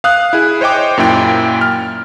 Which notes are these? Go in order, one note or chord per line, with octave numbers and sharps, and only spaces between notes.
F5 D#6 F#6
E4 G#4
C5 C#5 D#5 G5 D6
F#2 A#2 E4 G5
F6